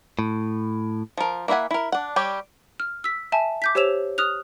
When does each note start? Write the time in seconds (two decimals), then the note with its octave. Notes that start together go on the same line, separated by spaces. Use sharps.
0.19 A2
1.17 F3 A#4
1.48 A#3 E4 E5 F#5 G#5
1.71 E4 A#4
1.92 D4 F#5
2.16 G3 G4 C#5
2.80 F6
3.04 E6 B6
3.32 E5 G#5 A5
3.62 D6 G6 B6
3.75 G4 C5 C#5 E6 E7 F7
4.18 D#6 F6 F#6 F7